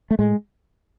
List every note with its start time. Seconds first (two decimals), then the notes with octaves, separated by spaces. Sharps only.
0.11 A3
0.19 A2 G#3